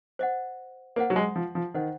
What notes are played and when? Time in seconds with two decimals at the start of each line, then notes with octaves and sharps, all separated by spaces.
0.19 C5 D#5 F#5
0.96 A#3 C5 D#5 F#5
1.10 F#3
1.16 G#3
1.36 F3
1.55 F3
1.74 D#3 C5 D#5 F#5